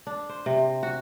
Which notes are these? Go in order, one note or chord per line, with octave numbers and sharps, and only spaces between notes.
D4
C5
C3
F#4